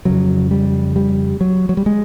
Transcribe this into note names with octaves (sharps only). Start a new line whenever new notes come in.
F2 C#3 F#3
G3
G3
F#3
F#3
G3
G#3